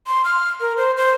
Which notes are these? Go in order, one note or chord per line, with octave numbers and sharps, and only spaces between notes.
C6
F6
A#4
C5
C5